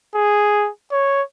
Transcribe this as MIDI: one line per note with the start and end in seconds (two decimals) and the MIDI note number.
0.15 0.69 68
0.92 1.22 73